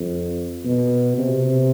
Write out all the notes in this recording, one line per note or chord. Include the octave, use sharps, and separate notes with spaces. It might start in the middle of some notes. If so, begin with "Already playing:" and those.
Already playing: F2
B2
C3